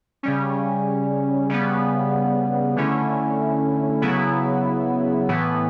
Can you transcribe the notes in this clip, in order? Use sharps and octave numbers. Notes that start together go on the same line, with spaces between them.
C#3 G3 C#4
C#3 G3 B3
D3 A3 C#4 E4
C#3 F#3 B3 E4
A2 E3 B3